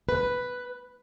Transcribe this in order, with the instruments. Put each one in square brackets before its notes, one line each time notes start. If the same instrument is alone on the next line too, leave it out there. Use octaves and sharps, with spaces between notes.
[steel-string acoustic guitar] B4